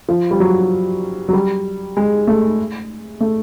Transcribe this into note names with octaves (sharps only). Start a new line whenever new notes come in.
F3
G3
F#3
F#3
G3
G#3
A3
A3